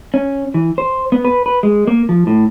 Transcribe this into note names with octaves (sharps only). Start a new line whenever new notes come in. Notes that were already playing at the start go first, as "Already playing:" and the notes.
C#4
E3
C5
B3
B4
B4
G#3
A#3
F3
A2